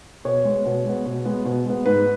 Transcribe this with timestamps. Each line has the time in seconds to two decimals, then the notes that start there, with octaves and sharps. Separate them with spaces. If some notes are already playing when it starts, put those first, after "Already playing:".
0.25 B2 C#5
0.45 G#3 B3
0.66 B2
0.86 G#3 B3
1.06 B2
1.25 G#3 B3
1.45 B2
1.66 G#3 B3
1.85 G#2 B4